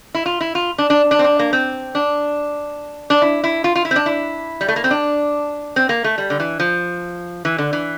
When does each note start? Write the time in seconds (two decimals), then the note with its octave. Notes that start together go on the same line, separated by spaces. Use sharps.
0.15 E4
0.26 F4
0.41 E4
0.55 F4
0.78 D4
0.90 D4
1.11 D4
1.19 C4
1.24 D4
1.39 A#3
1.53 C4
1.95 D4
3.10 D4
3.22 E4
3.44 E4
3.64 F4
3.76 F4
3.85 E4
3.91 C4
3.96 D4
4.06 E4
4.61 G3
4.68 A3
4.76 A#3
4.84 C4
4.91 D4
5.76 C4
5.89 A#3
6.04 A3
6.18 G3
6.30 D3
6.40 E3
6.60 F3
7.45 E3
7.58 D3
7.73 E3